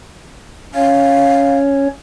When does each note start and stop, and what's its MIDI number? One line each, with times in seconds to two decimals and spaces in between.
0.75 1.88 61
0.75 1.88 73
0.75 1.57 77